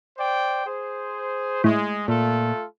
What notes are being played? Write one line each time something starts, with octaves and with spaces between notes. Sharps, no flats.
C5 D5 G5
G#4 C5
A2 G#3
A#2 A3 F4 A4